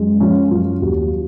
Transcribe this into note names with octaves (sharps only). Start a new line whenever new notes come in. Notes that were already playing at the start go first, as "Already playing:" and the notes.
Already playing: F#2 G#3
F3 C#4
F#2 F4
D#2 F#4